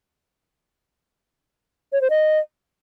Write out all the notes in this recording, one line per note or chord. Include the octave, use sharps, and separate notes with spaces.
C#5
C5
D#5